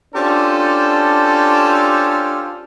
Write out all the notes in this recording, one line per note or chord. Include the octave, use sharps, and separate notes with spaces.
C#4 D4 F4 G4 A4 C5